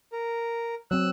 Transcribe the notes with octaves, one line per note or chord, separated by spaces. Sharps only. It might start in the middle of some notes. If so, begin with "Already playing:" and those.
A#4
F#3 C4 E6 F#6